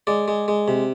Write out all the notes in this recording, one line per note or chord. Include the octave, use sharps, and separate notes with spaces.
G#3 D5
G#3
G#3
C3